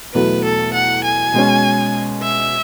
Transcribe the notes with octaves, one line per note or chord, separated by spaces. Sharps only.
E2 B2 F#3 A3 B4
A4
F#5
G#5
B2 G#3 C#4
E5